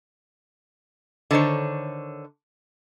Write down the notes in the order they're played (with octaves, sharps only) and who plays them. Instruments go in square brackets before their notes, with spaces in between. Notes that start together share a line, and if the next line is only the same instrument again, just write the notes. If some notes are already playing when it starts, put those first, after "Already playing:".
[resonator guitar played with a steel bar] D3 D#3 C5 C#5